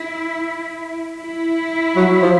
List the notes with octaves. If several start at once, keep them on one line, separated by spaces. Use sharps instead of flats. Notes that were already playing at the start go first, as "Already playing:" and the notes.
Already playing: E4
E4
F#3
F3